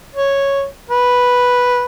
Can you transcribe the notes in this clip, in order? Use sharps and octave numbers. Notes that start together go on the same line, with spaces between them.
C#5
B4